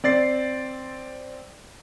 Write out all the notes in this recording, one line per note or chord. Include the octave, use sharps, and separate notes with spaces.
C4 D5 A6 C7